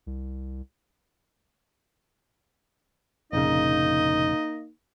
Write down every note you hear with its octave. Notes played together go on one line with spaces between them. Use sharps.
C2
F1 A#1 C#3 A#3 D#4 D#5